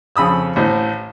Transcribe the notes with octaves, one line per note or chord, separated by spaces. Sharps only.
F2 C#3 B5 D#6 E6
A1 A2 C5